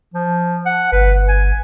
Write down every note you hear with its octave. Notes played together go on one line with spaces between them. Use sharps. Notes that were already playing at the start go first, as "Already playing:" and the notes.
F3
F#5
G1 B4
G#5